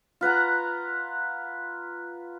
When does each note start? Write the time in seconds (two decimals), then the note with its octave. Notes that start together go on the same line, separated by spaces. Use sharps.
0.21 F4 B4 F#5 A#5